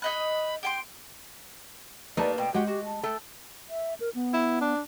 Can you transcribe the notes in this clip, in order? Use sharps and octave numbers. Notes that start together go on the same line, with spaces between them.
D#4 D#5 B5 F#6
G4 G5 C6 D7
G3 A3 A#3 D#4 B4 D5 A5
B2 G5
G#3 F#4 G4 F#5 G5
F#4 G4
A5
A3 A4 G5
E5
A#4
B3
E4
D4